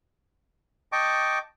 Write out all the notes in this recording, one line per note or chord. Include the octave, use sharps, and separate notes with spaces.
D#5 G5 A5 C#6 D6